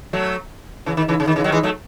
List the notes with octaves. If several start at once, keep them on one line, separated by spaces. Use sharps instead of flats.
F#3 A3
C#3 E3
D#3
C#3 E3
C#3
D#3
C#3 E3
D#3 F#3
E3 G#3
F#3 A3